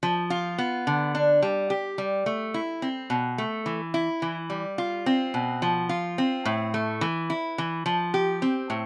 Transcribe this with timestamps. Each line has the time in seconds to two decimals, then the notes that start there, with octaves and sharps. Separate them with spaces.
0.03 F3
0.30 F4
0.58 B3
0.87 D3
1.15 D4
1.42 G3
1.70 G4
1.98 G3
2.26 A3
2.54 E4
2.82 C4
3.10 B2
3.38 A3
3.66 E3
3.94 E4
4.22 E3
4.50 G3
4.78 F4
5.06 C4
5.34 B2
5.62 F3
5.89 F4
6.18 C4
6.45 A2
6.74 A3
7.01 E3
7.30 E4
7.58 E3
7.86 F3
8.14 G4
8.42 C4
8.70 A2